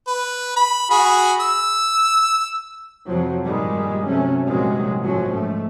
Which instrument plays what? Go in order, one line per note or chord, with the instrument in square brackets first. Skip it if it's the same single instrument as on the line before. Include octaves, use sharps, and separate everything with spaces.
[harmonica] B4
B5
F#4 G#4 B5
E6
[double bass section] F2 C3 F3 F#3
G2 A#2 D#3 G3 G#3
C3 F#3 A3 C#4
A#1 G2 C3 D#3 F#3 G#3
A#1 A2 F3 F#3 C#4
G#2 A3